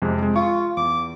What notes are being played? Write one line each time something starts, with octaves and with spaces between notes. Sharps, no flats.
F2 C3 G#3
G#3
F4 C#6
E2 D6